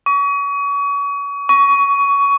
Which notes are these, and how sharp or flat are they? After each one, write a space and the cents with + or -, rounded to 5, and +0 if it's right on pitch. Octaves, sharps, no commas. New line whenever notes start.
C#6 +35
C#6 +20